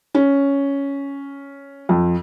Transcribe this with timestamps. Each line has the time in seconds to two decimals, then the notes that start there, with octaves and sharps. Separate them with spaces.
0.15 C#4
1.89 F2